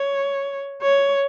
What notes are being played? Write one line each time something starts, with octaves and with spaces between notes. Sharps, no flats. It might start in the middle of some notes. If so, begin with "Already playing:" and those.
Already playing: C#5
C#5